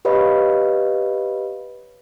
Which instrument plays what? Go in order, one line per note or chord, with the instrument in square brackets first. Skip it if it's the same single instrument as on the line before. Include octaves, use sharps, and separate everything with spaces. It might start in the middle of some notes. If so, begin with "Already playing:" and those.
[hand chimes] G4 B4 C#5 D#5 F5 B5